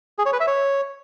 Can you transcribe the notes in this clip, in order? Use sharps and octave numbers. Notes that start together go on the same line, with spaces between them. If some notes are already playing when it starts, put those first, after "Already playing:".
G#4
C#5
B4
E5
C#5